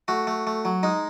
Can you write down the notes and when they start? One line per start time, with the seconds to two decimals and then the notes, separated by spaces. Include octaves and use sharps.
0.08 A3 F#4
0.27 A3
0.47 A3
0.65 F#3
0.83 G#3 D#4